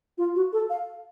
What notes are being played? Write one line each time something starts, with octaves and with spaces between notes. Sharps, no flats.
F4
F#4
A4
F5